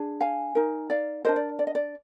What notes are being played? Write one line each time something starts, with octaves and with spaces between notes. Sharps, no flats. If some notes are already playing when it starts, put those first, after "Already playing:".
Already playing: D4 G#4
F5 G#5
D#4 A#4
D5 F5
D4 G4 A#4 C5 D#5
D5
D5
D#5
D5